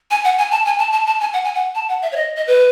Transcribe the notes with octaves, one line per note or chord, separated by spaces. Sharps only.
G#5
F#5
G#5
A5
G#5
A5
A5
A5
G#5
F#5
G#5
F#5
A5
F#5
E5
C#5
D#5
D#5
B4